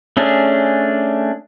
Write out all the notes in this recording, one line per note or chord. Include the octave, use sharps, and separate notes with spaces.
A3 C#4 D4 G#4